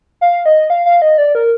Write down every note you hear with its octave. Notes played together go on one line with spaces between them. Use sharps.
F5
D#5
F5
F5
D#5
D5
A#4